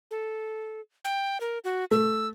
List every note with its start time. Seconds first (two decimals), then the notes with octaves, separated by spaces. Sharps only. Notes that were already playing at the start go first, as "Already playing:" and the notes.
0.11 A4
1.05 G5
1.41 A#4
1.64 F#4
1.91 A3 E6